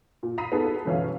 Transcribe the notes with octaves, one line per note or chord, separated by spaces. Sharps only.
A#2
A#5 B5 D#6 B6 C7 D#7
B3 D#4 F#4 G#4 A4
F#2 B2 E3 C#4 F5